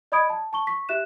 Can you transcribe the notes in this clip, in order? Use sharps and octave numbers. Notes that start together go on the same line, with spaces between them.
D5 D#5 B5 D#6 G#6 D7
A5
A5 C#6 G7
C#6 B6
G4 E5 F#6 E7